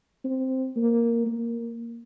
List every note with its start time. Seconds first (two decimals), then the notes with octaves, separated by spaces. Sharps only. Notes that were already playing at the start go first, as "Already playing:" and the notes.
0.24 C4
0.76 A#3
1.26 A#3